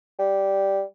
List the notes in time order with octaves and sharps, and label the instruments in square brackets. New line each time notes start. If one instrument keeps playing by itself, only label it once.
[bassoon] G3